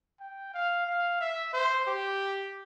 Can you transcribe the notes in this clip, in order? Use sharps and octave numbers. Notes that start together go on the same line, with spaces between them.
G5
F5
F5
E5
C5
G4